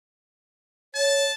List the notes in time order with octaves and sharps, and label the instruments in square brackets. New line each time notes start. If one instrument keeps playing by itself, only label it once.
[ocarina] C#5 [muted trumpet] A5